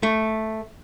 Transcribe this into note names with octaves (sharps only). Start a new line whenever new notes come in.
A3